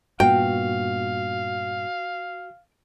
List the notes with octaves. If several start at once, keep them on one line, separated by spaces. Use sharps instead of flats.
G2 A#2 B3 F#4 F5 G5